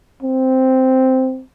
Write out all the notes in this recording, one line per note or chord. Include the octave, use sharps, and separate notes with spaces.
C4